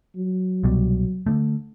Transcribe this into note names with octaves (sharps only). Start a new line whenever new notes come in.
F#3
C2 B2 G3
D3 A3